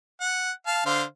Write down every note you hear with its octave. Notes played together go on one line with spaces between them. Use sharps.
F#5
F5 A5
D3 C5 F5